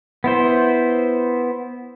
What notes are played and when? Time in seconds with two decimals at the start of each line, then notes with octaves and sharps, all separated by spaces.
0.24 B3 E4 C5